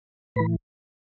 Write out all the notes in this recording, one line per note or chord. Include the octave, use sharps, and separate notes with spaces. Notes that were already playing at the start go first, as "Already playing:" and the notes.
A2 E3 B4 B5